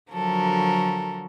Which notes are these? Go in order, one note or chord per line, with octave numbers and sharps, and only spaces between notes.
D3 F3 F#3 F#4 A4 A#4